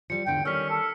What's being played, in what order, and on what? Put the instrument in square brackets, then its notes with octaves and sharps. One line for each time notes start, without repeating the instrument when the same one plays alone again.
[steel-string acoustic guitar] F3 G3 [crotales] C#7
[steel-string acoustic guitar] E2 G#2 D3 [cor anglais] G5
[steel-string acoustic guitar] D#3 G3 [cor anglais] C#4 [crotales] E6 F6 B6
[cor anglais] A4